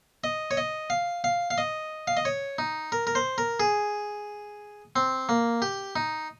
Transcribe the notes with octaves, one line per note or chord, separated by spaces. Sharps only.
D#5
C#5
D#5
F5
F5
F5
D#5
F5
D#5
C#5
D#4
A#4
A#4
C5
A#4
G#4
C4
A#3
G4
D#4